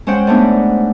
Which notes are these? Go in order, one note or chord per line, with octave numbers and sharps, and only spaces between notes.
G#3 C#4 C5 F#5 G5
G#2 A3 B3 D4